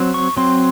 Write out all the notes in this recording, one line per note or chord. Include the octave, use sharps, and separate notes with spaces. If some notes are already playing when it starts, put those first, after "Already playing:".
Already playing: F#3 C4
C#6
F#3 C4 C6